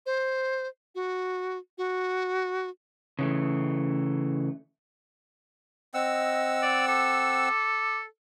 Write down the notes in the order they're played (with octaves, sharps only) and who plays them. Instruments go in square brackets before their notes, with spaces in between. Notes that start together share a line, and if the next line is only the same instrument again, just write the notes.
[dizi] C5
F#4
F#4
[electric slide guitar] C#3 E3 A3
[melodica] C4 F#5 E6 [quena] D#5
[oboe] D5
[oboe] A4 [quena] D6